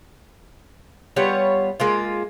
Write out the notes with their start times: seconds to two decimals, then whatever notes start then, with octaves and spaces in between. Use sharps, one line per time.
1.16 G3 B3 F4 C#5
1.80 G#3 A#3 F4